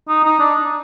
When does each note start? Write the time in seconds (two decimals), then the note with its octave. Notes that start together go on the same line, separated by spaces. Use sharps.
0.08 D#4
0.24 D#4
0.40 D4